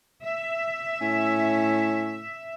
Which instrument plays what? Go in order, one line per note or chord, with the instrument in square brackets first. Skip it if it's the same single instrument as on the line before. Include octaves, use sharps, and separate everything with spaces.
[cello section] E5
[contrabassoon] A2 [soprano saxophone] C#4